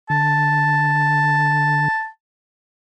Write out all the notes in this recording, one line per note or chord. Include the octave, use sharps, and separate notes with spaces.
D3 A5